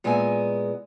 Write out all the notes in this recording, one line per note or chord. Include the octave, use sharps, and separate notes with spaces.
A#2 G#3 B3 E4 E5 G#5